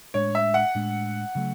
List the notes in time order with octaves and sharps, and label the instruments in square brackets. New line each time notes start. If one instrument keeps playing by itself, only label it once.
[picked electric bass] A2 G#3 D4 [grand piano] C#5
[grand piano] E5
F#5
[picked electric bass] A2 G#3 D4
C#3 F#3 A3